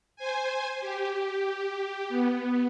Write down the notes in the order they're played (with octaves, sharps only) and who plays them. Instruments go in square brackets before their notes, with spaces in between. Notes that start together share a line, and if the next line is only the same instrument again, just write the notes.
[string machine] C5 G#5
G4
B3